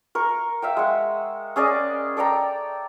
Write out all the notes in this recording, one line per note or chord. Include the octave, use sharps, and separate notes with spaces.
A#4 C#6
E5 F5 G5
G#3 F#5
C#4 G#4 D5 D#5
A4 D5 G5 A#5